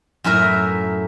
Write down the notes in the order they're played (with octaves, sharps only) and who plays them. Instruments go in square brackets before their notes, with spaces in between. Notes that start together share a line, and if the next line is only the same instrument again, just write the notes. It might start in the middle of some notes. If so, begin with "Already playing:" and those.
[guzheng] F#2 A2 A#4 E5